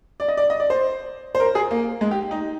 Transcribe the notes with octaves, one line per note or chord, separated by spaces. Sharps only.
D5
D#5
D5
D#5
D5
C5
C5
A#4
G#4
A#3
G#3
G4
D#4